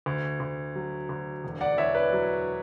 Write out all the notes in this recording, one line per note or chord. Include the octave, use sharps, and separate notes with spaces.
D2
D2
F#3
D2
E1
D5 F#5
E2 C#5 E5
B4 D5
F#3